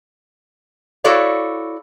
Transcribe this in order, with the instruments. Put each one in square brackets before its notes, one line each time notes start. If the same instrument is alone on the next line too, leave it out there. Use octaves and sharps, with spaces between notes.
[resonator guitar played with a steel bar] E4 F#4 A4 C#5 D5 F5